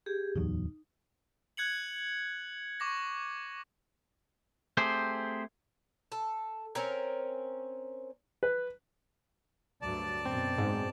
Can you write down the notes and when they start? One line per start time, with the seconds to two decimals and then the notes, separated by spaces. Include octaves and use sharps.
0.06 G4 G#4
0.36 D1 E2 F#3 D#4
1.57 F#6 G#6 C#7 F#7
2.80 C#6 D6 A#6
4.77 A3 C4 G4 G#4 C5
6.12 A4
6.75 C4 C#4 A#4
8.43 B4
9.82 D2 G2 F#3 D5 A5
10.26 F#2 B2 C4
10.58 G#2